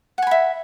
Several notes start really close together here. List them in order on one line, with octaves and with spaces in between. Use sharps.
F#5 G#5 B5 E5